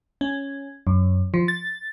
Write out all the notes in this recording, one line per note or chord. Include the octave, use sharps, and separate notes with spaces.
C#4
F#2
F3
A6